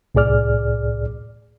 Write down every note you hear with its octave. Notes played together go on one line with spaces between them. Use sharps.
C2 A2 G#4 D5 F6